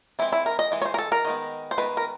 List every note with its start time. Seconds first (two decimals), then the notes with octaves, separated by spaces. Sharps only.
0.19 E3 G#3 C4 E4
0.32 E4
0.46 A#4
0.59 D#5
0.72 E3 G#3
0.82 C#5
0.85 C5
0.94 A#4
0.98 A4
1.12 A#4
1.25 D#3 G#3 B3
1.71 C5
1.77 D#3 G#3 B3 B4
1.97 A#4